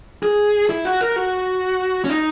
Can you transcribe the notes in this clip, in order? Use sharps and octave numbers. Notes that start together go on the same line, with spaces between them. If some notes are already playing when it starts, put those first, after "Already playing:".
G#4
E4
F#4
A#4
F#4
C#4
D#4